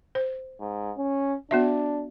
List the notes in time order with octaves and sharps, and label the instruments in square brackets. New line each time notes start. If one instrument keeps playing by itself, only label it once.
[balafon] C5
[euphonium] G#2
C#4
[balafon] B3 F#4 E5 [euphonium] D4